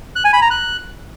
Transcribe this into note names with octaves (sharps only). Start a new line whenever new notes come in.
F#6
G#5
B5
A#5
F#6